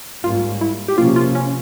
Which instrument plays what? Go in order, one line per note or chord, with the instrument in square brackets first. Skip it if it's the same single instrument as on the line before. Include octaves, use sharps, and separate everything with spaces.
[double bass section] G#2 G3 A#3 C#4 [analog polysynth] F4
[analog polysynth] E4
G4
[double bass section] C3 F3 A#3 C#4 [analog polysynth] F4
[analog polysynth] F4
C#4